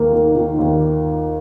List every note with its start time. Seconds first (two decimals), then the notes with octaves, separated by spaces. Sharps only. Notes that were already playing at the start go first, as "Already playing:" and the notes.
Already playing: D#2 A#3
0.13 D#3
0.36 D#3
0.59 D#2